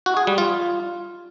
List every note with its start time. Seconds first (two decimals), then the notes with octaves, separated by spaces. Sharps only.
0.06 F#4
0.17 G#4
0.27 G3
0.38 F4